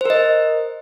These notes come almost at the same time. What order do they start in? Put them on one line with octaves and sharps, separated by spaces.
C5 A#4 D#5